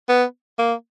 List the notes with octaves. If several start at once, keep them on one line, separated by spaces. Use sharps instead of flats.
B3
A#3